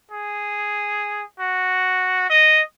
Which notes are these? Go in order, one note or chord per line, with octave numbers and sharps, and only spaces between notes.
G#4
F#4
D#5